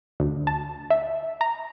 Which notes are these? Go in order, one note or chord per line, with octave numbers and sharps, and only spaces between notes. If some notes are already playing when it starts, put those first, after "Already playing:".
D2
A5
E5
A#5